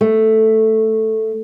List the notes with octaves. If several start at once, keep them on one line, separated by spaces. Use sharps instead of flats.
A3